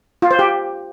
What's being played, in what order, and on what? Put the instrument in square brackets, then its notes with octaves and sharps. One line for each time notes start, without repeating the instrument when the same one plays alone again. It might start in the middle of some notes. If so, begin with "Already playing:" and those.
[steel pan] F4
C5
G4